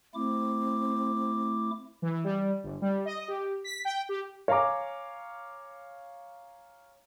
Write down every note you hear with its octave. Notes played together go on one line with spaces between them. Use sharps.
A3 C4 E4 D6
E3
G3
G1
G3
D#5
G4
B6
G5
G4
C#5 F5 G#5 A#5 D6